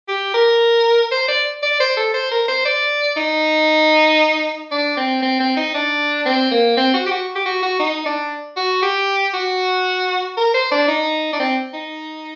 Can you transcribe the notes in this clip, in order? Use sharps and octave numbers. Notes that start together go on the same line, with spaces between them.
G4
A#4
C5
D5
D5
C5
A4
C5
A#4
C5
D5
D#4
D4
C4
C4
C4
D#4
D4
C4
A#3
C4
F#4
G4
F#4
G4
F#4
F#4
D#4
D4
F#4
G4
F#4
A#4
C5
D4
D#4
D4
C4
D#4